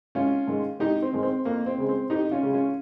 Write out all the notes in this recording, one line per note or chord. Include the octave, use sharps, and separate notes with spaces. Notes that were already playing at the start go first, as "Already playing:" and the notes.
G#1 C#4 F4
G#2 D#3 G#3
G#1 D#4 G4
C4
G#2 D#3 G#3
C4
F2 A#3
C4
C#3 G#3
C4
F2 D#4 G4
C#4 F4
C#3 G#3
C#4 F4